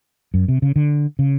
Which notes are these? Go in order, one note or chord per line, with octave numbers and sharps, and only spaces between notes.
F#2
C3
C#3
D3
C#3